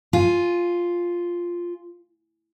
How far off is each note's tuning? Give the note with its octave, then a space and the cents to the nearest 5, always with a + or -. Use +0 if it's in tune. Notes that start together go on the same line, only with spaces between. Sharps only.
F4 +0 G#5 +0